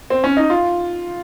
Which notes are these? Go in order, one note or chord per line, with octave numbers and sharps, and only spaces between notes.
C4
C#4
D#4
F4